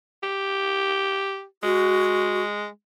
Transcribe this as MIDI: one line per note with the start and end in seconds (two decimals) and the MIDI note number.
0.23 1.44 67
1.63 2.68 56
1.63 2.42 66